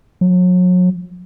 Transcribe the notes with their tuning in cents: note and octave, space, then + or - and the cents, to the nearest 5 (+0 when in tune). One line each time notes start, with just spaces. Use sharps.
F#3 -35